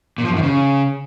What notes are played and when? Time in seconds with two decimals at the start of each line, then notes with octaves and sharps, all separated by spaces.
0.18 A#2
0.24 F3
0.31 F#2
0.37 D#3
0.43 C#3